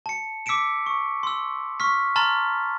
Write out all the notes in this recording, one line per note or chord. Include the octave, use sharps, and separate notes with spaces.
A5 C#7
D6 E6 B6 C#7 D7 E7
C#6
C6 E6
C#6 F6 B6
A5 A#5 C6 F6 A6